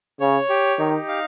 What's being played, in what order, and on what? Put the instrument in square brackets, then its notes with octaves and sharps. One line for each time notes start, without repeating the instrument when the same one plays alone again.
[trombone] C#3 [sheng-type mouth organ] C#5
[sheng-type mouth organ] G4
[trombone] D#3 [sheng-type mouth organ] D#4
[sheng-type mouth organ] F5